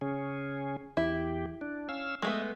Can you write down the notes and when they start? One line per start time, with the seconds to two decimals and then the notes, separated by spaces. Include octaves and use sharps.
0.01 C#3 C#4 G#4
0.97 E2 E4 G4
1.61 D4
1.89 C#4 F5 E6
2.22 G#3 A3 B3 D#5 E5